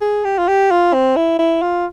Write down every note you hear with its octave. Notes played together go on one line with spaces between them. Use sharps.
G#4
G4
F4
G4
F4
C4
E4
E4
F4